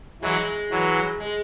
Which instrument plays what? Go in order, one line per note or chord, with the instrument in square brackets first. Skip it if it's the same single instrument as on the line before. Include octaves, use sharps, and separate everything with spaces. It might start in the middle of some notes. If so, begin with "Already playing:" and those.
[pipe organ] E3 F#3 [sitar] G#3
[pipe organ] E3 F#3
[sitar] G#3